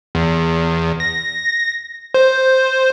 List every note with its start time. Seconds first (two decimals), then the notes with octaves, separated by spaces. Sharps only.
0.15 E2
1.00 A#6
2.14 C5